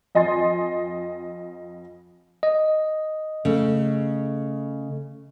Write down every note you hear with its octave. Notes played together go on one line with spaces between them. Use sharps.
F2 D#5 G#5 C6 A6
D#5
C#3 A3